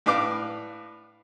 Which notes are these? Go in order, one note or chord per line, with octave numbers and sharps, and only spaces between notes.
A2 D4 B4 F5 D6